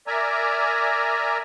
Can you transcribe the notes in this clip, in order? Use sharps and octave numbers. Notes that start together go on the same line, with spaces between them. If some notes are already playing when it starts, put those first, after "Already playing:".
A#4 D5 E5 G#5 A#5